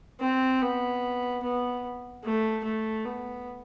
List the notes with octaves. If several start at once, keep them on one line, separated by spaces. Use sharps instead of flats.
C4
B3
B3
A3
A3
B3